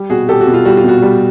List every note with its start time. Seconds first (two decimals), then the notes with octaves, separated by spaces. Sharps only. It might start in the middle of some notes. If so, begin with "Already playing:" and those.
Already playing: G3
0.10 B2 F#4 G#4
0.29 G3 G4 A4
0.41 F#4
0.47 B2
0.54 F4
0.65 G3 F#4
0.77 F4
0.84 B2 F#4
1.02 G3